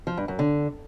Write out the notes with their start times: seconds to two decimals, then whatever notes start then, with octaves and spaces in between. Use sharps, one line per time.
0.07 F3
0.17 G2
0.28 F#2
0.39 D3